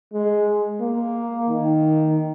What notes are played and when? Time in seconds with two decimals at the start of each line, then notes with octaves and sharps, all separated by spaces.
0.13 G#3
0.81 A#3
1.49 D#3